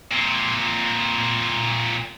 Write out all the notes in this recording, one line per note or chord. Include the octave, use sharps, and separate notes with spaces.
A#2 C4